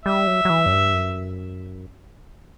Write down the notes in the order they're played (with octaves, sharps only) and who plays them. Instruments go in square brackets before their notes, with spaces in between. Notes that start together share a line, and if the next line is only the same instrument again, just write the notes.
[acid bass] G3 [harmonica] E5
[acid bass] F#3
F#3
E3
F#2
G2
F#2